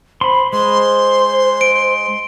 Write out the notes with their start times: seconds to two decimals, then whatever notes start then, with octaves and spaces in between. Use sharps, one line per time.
0.21 C5 B5 C6
0.53 G#3 C5 C6
1.61 D7